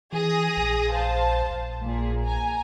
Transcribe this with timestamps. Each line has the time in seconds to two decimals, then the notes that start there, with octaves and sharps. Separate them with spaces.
0.12 E3 G#4 D#6 A#6
0.57 A#1
0.91 C5 F5 A5
1.50 A#1
1.83 A#2 G#4
2.24 G#5 A#5